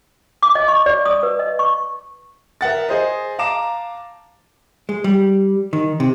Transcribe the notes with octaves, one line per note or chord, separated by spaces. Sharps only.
D6
D#5
C#6
D5
D#6
B4
D#5
C#6
A#4 E5 F#5 A6
G#4 C5 D#5
F5 A5 A#5 D6 E7
G#3
G3
D#3
C3